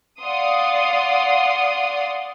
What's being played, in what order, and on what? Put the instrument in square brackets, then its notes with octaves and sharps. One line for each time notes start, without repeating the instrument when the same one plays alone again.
[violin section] D5 F5 F#5 C6 D#6